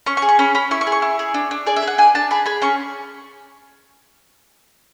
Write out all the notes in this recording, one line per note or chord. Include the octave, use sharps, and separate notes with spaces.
C#4 C#6
C#6
G#4
C#6
C#4 B5
C#4 B5
E4 C#6
C#6
G#4
C#6
E4
G#4
D4
D4
G#4 D5
E5
G#4
F#5
D4 G#5
D4 A5
G#4 B5
G#4 B5
C#4 C#6